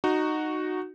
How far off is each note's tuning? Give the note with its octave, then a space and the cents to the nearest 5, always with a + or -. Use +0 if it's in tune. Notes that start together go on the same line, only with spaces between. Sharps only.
D#4 -15 F#4 +0